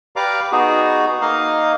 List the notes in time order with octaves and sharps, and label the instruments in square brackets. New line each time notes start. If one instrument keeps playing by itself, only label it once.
[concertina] G4 B4 D5 F5 A#5 D6
B3 D#4 F#4 G#4
A#3 D#4 D#5 F5